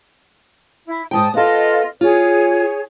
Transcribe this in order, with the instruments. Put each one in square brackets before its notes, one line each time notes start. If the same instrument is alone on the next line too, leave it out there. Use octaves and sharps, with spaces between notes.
[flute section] E4
[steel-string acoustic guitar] G#2 D#3 G5 [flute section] A5 D#6
[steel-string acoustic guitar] B3 A4 [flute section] F4 D#5
[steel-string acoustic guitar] F4 [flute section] G#4 C#5